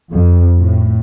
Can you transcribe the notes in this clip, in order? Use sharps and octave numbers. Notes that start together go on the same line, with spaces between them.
F2
A2